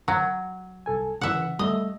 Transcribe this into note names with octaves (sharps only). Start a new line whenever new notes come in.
F#3
C2 A4 G#5
C#3 E3 E5 F#5
G3 A3 D#5 E5